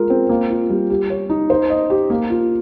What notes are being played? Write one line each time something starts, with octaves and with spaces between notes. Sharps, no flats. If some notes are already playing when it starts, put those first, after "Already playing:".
Already playing: G#3 F4 A#4
C4
A#3
F4
G3
G4
C#5
D#4
C5
D#5
G4
A#3
F4